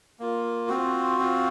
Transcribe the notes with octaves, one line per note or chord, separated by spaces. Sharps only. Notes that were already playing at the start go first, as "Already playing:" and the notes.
A#3 F4
C4 F4 F#4
C4 F4